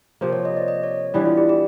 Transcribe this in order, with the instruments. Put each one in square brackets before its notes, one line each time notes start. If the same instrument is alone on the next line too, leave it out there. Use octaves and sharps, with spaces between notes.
[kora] C3 F3 A#3 [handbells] C5
[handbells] C#5
D#5
D5
D#5
C#5
[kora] E3 G3 B3 D4 [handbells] E4
[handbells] F4
G4
G4